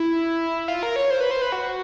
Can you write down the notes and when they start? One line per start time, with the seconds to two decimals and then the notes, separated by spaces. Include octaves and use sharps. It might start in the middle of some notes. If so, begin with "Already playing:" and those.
Already playing: E4
0.68 F4
0.83 A#4
0.96 C#5
1.10 C5
1.20 B4
1.31 C5
1.42 B4
1.52 F#4